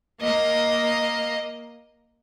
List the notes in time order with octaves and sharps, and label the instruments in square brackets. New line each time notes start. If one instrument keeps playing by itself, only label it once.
[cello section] A#3 [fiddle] D#5